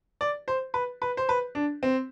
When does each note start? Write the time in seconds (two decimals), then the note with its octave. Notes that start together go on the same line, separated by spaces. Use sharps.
0.21 D5
0.48 C5
0.74 B4
1.02 B4
1.17 C5
1.29 B4
1.55 D4
1.83 C4